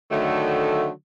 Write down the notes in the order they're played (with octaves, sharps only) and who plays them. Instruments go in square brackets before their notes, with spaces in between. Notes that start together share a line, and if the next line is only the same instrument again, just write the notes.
[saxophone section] D3 D#3 F#3 A3